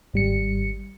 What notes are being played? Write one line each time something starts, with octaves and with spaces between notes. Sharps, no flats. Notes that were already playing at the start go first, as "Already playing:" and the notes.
G#1 G3 C#7